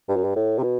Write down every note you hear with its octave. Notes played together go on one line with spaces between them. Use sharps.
G2
F#2
G2
A2
C3
B2